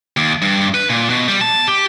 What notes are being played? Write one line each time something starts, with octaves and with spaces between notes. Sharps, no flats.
D#2
G2
B4
A#2
B2
G3
A5
G4